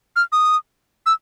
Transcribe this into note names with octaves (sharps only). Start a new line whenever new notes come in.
F6
D#6
E6